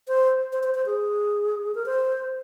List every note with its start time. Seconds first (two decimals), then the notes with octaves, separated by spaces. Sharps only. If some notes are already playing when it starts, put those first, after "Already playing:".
0.08 C5
0.53 C5
0.63 C5
0.75 C5
0.86 G#4
1.75 A#4
1.86 C5